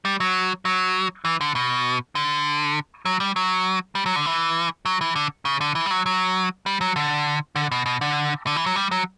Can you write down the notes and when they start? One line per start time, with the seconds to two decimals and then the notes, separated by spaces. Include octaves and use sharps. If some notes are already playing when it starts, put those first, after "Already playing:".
0.05 G3
0.20 F#3
0.65 F#3
1.25 E3
1.41 D3
1.55 B2
2.15 D3
3.05 F#3
3.20 G3
3.36 F#3
3.95 G3
4.06 F#3
4.16 D3
4.26 E3
4.86 F#3
5.01 E3
5.16 D3
5.45 C#3
5.61 D3
5.75 E3
5.86 G3
5.91 F#3
6.06 F#3
6.66 G3
6.81 F#3
6.96 D3
7.56 D3
7.72 B2
7.86 B2
8.01 D3
8.47 D3
8.56 E3
8.66 F#3
8.76 G3
8.91 F#3